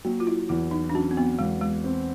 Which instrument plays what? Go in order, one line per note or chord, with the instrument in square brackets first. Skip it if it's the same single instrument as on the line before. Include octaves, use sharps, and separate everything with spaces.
[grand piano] F#3 [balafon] A#3
[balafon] F4
E4
[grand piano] E2 [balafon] E4
[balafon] D#4
D4
[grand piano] F#3 [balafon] C#4
[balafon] C4
B3
[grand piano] E2 [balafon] G#3
[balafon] G#3
[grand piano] C4